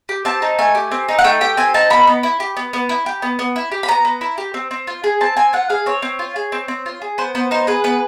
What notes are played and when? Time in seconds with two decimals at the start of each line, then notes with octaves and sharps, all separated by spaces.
0.09 G4
0.25 C4 A5
0.42 D#4
0.59 A3 G#5
0.75 G4
0.91 C4
1.08 D#4
1.19 F#5
1.24 A3 G5
1.41 G4 G5
1.57 C4 G#5
1.74 D#4 A5
1.90 B3 B5
2.07 B3
2.23 E4
2.40 G4
2.57 B3
2.73 B3
2.89 E4
3.06 G4
3.22 B3
3.39 B3
3.56 E4
3.72 G4
3.83 B5
3.88 B3 A#5
4.05 B3
4.21 E4
4.38 G4
4.54 C4
4.71 C4
4.87 F4
5.04 G#4
5.21 C4 A5
5.37 C4 G#5
5.53 F4 F#5
5.70 G#4 F5
5.86 C4 C#5
6.02 C4
6.19 F4
6.36 G#4
6.52 C4
6.68 C4
6.86 F4
7.02 G#4
7.18 B3 C5
7.35 B3 C5
7.51 D#4 C5
7.67 G#4 B4
7.84 B3 B4